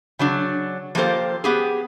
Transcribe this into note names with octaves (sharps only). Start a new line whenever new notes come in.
C#3 F#3 D4
F3 A#3 F4 G4 A4 C5
B3 G4 G#4